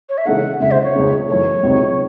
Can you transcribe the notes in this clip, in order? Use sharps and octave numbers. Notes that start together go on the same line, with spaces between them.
C#5
E5
C#3 E3 G#3 D#4 A4 F#5
C#2 C#3 G#3 E5
C5
C#5
C#2 C#3 G#3 D#4
F#2 E3 A3 C#5
C#2 C3 F#3 C4 D#4